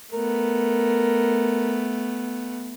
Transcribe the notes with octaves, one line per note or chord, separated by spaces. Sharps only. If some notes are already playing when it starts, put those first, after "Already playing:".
A3 B3 A#4